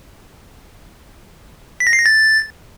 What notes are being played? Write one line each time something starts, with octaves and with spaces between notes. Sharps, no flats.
B6
A#6
C7
A#6
A6